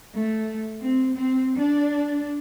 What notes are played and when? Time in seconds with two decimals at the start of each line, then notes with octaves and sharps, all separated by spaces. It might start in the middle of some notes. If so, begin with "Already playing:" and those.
0.14 A3
0.81 C4
1.17 C4
1.58 D4